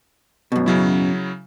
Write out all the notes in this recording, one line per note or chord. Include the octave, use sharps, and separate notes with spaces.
F#2 B2
C#3 F#3 E4